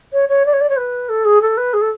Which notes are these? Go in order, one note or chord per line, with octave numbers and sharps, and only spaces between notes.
C#5
C#5
D5
C#5
D5
C#5
B4
A4
G#4
A4
B4
G#4
A4